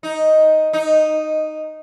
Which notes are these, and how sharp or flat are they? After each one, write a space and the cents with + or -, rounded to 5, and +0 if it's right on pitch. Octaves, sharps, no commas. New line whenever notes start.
D#4 +5
D#4 -5